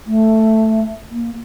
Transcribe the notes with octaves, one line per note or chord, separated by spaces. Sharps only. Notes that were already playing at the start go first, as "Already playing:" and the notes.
A3
A#3